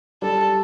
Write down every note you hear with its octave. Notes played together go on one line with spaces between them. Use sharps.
G3 A4